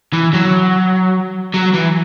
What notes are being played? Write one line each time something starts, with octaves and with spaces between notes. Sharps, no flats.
E3
F#3
F#3
E3